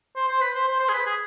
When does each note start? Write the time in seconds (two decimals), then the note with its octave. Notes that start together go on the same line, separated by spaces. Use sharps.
0.16 C5
0.29 C5
0.41 B4
0.55 C5
0.67 C5
0.80 C5
0.89 G#4
0.93 B4
1.06 G#4